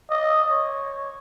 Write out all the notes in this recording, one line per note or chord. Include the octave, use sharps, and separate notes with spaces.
D#5
C#5